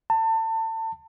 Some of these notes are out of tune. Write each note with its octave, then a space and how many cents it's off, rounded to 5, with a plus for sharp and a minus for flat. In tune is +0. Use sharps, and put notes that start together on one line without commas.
A5 +30